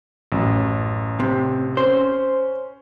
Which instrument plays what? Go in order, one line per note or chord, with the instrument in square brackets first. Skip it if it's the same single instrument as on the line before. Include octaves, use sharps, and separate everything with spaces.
[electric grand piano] A1 F#2
[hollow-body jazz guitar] C3
[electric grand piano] C#4 [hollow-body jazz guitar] C5